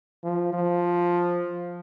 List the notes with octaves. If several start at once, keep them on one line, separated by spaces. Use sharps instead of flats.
F3
F3